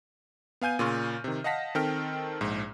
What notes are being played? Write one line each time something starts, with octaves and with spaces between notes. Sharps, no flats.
B3 F5 G#5 G6 D#7
A#2 C#3 C6 C#6 F6
C3 D#3
D#5 F5 F#5 A5 A#6 B6
D#3 C4 A4 G5 F6
A#1 G#2